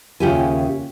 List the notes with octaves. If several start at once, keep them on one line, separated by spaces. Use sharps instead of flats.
D#2 C#3 F4 G4 E5 G#5